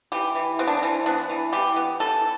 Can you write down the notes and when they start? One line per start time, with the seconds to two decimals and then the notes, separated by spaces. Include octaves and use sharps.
0.12 E3 G4
0.35 E3
0.59 B3 C4
0.68 D4
0.77 C4
0.83 E3
1.06 B3 D4
1.30 E3
1.53 E3 G4
1.76 B3
2.00 E3 A4